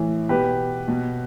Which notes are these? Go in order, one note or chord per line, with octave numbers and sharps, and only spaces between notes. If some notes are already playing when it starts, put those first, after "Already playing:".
Already playing: A2 E3
B2 G4 B4
B2